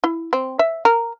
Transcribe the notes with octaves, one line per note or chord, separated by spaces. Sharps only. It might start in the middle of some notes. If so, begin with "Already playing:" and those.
E4
C4
E5
A#4